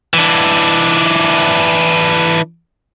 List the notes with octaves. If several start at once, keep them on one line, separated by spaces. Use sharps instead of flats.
E3 D4